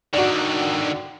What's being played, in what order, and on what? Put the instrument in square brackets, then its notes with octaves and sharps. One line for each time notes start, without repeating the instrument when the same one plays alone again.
[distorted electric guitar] D3 D#3 [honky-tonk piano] F#4 D5